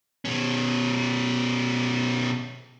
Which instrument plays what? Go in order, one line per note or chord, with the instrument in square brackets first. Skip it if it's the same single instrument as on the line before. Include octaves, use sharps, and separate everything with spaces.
[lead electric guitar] B2 C#4